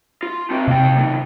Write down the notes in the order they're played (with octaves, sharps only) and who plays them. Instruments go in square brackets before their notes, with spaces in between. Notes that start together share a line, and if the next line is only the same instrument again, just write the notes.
[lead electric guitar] F4
C4 F#4
[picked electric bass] C3 [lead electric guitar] A#3 G5
[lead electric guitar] F#2 D#3